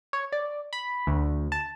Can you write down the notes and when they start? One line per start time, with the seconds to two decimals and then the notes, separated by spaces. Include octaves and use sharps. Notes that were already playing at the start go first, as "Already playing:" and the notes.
0.13 C#5
0.32 D5
0.73 B5
1.07 D2
1.52 A5